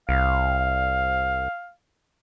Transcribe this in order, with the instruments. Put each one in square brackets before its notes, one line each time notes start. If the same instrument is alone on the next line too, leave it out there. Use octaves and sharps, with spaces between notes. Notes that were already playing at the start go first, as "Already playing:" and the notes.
[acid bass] C2 [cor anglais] F5